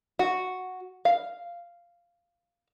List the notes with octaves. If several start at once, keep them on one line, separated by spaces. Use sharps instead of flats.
F#4
F5